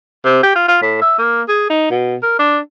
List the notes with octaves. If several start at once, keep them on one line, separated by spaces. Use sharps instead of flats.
C3
G4
F4
F4
A2
E5
A#3
G#4
D#4
B2
A#4
D4